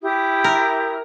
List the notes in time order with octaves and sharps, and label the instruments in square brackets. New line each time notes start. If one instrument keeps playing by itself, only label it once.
[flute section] E4 G4 D#6
[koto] A#4